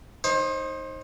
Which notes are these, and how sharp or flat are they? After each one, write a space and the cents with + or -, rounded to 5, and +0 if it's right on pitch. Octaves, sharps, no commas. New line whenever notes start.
D#4 +0 C5 +30